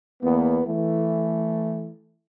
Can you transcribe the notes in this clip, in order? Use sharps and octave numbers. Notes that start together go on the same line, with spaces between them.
E2 A#3 B3
E3 A3